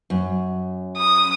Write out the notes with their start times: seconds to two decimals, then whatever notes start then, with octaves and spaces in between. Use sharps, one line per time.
0.10 F#2
0.98 D#6